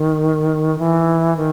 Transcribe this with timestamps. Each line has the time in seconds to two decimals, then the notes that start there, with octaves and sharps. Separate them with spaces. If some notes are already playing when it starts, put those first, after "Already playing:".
Already playing: D#3
0.79 E3
1.37 D#3